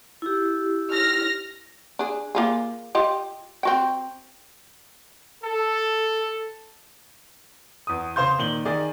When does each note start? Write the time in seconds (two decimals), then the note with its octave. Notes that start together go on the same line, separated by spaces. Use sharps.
0.22 E4 G4
0.91 F6 A#6
1.99 D4 G#4
2.35 A#3 F4 G#4
2.95 F4 G4 D#5
3.63 C4 F#4 G5
5.43 A4
7.87 E2 D#6
8.16 C#3 C5 F5 C6 G6
8.39 A#2 D#3 F#7 G7
8.65 D#3 G#4 D5